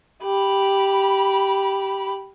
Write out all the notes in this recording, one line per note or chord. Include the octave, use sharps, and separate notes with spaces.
G4 B5